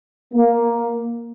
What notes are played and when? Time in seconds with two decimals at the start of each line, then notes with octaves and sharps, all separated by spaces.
0.34 A#3